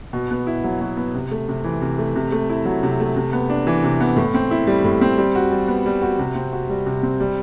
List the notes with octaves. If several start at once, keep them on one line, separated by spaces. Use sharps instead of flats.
B2
B3
E4
F#3
B2
B3
C3
A3
C3
E3
C3
A3
C3
A3
E4
F#3
C3
A3
C3
B3
D4
E3
C3
B3
A2
C4
E4
G3
A2
C4
G3
F#4
G3
B3
G3
F#4
C3
C4
F#4
G3
C3
C4
G3